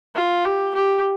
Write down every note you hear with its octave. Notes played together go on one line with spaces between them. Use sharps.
F4
G4
G4